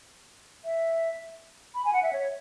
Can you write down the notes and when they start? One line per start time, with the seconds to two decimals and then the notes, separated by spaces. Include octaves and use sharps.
0.65 E5
1.75 B5
1.85 G#5
1.93 F#5
2.03 E5
2.13 C#5